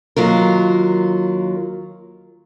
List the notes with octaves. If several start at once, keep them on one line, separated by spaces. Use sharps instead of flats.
D#2 F#3 F4 A#4